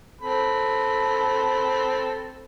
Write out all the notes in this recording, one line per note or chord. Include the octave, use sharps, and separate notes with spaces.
C4 A4 B5